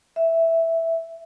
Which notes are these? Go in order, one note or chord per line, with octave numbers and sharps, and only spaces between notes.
E5